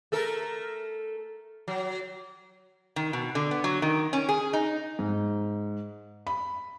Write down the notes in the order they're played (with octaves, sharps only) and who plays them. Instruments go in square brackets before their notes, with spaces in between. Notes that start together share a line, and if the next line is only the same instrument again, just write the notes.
[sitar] A3 A4 A#4
F#3
[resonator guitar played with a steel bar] D#3
B2
D3
B3
F#3
D#3
C#4
G#4
D#4
[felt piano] G#2
B5